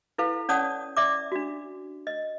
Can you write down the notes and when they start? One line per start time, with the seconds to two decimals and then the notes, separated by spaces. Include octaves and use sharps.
0.18 E4 A4 B4 F5
0.49 C#4 C#5 D5 F#5 A5 D#6
0.97 D5 E5 D6
1.32 D4 F#4
2.07 D#5